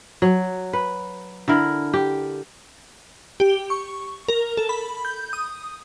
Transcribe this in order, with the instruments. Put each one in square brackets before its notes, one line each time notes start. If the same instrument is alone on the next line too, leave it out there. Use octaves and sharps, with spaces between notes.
[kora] F#3
B4
D3 E4 A#4
G4
[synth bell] G4
C#6
A#4
A4
B5
G6
D#6